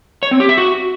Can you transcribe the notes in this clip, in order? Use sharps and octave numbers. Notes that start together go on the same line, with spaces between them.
C#5
C4
G4
E5
F#4